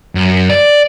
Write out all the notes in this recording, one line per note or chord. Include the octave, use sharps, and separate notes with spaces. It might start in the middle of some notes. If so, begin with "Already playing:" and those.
F#2
D5